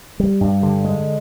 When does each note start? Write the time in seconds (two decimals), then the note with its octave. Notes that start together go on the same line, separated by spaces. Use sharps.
0.20 G3
0.41 G2
0.63 D3
0.85 G#3